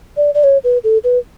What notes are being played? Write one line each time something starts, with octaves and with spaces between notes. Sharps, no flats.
D5
D5
C#5
B4
A4
B4